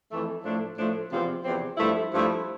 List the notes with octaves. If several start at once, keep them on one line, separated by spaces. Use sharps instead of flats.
F2 E3 A3
A2 F3 A3 D4
A2 F3 A3 D4
E2 C3 F3 C4
E2 C3 F3 C4
G2 F3 A3 E4
G2 F3 A3 E4